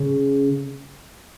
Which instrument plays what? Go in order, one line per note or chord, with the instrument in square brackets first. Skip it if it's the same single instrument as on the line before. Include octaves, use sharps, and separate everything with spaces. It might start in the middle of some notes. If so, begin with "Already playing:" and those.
Already playing: [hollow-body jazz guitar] C#3